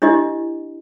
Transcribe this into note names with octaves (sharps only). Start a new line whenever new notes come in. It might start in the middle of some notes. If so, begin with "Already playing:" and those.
D4 E4 G4 D#5